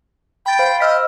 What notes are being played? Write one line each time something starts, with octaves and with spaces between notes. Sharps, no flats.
G5 B5 A6
C5 F5 B5
D#5 E6 F6 B6